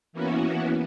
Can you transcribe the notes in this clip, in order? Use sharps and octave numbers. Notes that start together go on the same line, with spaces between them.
E3 A#3 B3 C#4 E4 F#4